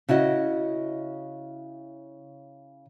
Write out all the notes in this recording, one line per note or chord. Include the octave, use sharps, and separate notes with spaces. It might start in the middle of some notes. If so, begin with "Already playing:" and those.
C#3 E4 F#4 D#5